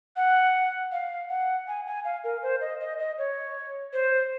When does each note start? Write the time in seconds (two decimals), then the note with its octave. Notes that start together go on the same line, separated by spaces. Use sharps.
0.16 F#5
0.92 F5
1.30 F#5
1.68 G#5
1.87 G#5
2.05 F5
2.24 A#4
2.43 C5
2.61 D#5
2.80 D#5
2.99 D#5
3.18 C#5
3.93 C5